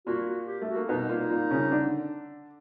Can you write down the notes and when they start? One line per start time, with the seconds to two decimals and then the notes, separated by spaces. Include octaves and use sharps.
0.06 A#2 A#3 F#4
0.27 F#4
0.47 G4
0.61 A3
0.69 F#4
0.75 A#3
0.89 B2 B3 D#4
1.09 A#2 A#3
1.30 A#2 A#3
1.51 C#3 C#4
1.71 D3 D4